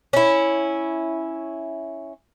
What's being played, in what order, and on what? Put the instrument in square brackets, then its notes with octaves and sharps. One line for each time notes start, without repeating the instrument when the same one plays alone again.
[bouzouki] C#4 E4